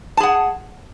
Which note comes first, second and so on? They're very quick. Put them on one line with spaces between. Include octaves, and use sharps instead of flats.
A5 G#4 F#5